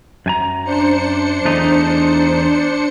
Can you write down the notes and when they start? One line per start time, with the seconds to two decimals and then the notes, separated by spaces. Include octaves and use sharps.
0.26 F#2 G#5 A#5
0.64 D4 C5 C#7
1.45 E2 A3 D#4